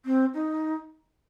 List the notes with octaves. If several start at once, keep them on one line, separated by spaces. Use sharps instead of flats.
C4
D#4